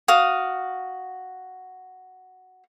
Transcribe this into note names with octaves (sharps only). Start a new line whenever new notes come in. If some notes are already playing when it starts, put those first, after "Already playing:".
F#4 F5 D#6